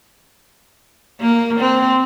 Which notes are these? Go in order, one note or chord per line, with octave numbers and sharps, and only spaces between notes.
A#3
C4